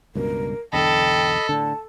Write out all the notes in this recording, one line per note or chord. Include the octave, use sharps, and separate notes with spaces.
C#2 G2 B2 A#4
B1 E2 D3 A4 D#5 G5 B5
A2 D3 A5